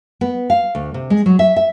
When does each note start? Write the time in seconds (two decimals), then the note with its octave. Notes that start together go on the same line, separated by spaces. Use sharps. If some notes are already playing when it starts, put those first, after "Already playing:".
0.21 B3
0.50 F5
0.75 D2
0.94 C3
1.10 G#3
1.26 F#3
1.39 E5
1.56 E5